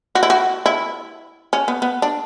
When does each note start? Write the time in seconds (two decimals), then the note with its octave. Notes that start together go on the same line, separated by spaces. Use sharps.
0.15 F#4
0.23 E4
0.30 F#4
0.66 E4
1.53 C#4
1.68 B3
1.82 B3
2.02 D4